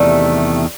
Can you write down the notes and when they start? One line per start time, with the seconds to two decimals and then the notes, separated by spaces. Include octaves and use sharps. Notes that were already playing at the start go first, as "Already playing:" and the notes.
Already playing: E2 C3 D#3 G3 A3